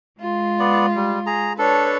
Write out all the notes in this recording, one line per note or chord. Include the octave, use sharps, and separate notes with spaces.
G#3 F4
B3 D5
G3
G#4 A#5
D4 A4 B4 C#5